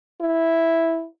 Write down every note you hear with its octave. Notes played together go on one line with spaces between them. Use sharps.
E4